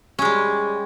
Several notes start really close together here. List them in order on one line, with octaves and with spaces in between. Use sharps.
C#4 G#3 G3